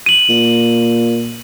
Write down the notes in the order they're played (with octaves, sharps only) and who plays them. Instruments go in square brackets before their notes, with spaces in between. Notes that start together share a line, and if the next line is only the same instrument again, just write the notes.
[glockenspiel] D#7 F#7
[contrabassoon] A#2